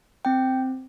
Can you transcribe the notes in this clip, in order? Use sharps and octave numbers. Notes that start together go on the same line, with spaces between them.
C4 G5